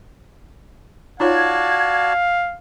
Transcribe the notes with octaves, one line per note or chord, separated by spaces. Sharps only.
D#4 F4 F#4 C#5 D5 F5 A5 G#6